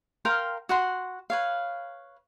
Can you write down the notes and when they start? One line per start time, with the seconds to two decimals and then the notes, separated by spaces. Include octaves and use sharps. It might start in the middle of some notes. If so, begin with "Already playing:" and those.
0.25 A#4 F5 G5 C6
0.69 F#4 F#5 C6
1.30 B4 C#5 F5